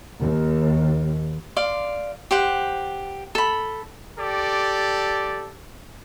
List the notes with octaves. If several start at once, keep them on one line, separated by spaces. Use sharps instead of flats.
D#2
D5 F5 C6
G4 C5 F#5
A4 B5
G4 A4 D5